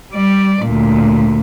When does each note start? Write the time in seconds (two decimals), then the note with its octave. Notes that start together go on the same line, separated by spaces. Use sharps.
0.12 G3 D5
0.64 D2 A#2